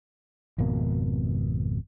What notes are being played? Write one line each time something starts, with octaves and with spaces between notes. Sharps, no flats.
G#1 F2 B2 A#3